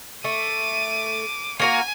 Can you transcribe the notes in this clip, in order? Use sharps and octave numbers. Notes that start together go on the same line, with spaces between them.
A3 D6 D#7
A#3 F#4 A#4 G#5